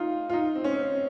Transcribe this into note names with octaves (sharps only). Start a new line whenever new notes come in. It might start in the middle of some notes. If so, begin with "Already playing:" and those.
Already playing: D#4 F4
F4
D#4
C4
C#4
C4